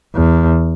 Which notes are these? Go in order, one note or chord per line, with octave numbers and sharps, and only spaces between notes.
E2